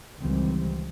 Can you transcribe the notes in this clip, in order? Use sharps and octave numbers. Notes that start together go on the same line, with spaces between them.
C#2 D#3 E3 G3 C4